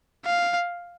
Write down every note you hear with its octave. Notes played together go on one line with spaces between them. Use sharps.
F5